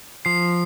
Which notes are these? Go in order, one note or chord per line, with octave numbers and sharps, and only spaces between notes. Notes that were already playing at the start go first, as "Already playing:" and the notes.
F3 C7